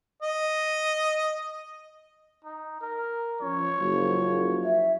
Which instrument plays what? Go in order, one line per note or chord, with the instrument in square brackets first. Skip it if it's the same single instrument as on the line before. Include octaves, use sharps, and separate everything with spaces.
[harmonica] D#5
[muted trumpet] D#4
A#4
[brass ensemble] F3 C#4 [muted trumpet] C#5
[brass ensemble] F#1 F3 F#3
[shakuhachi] E5